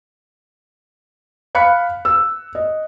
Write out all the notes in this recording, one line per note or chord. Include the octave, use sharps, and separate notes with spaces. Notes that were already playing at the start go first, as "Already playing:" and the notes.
F5 B5 F#6 C#7
E6
D#5